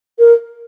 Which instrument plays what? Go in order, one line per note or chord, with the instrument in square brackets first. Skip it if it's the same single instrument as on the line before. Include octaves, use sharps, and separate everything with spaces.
[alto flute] A#4